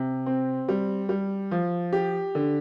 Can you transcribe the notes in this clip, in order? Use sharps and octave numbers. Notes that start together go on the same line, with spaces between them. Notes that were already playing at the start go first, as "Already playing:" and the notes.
Already playing: C3
C4
G3
G3
F3
G4
D3